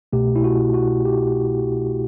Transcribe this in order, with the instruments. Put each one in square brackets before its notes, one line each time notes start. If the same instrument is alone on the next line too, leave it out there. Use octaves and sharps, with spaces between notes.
[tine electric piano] C2 B2 A3 G4
E4
F#4
F#4
G4